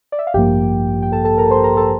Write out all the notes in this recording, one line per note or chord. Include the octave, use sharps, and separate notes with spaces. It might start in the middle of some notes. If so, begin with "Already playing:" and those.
D5
E5
F5
A1 G2 F3 A#3 G4 G5
G5
A4 A5
A4 A5
A#4 A#5
C5 C6
A#4 A#5
A4 A5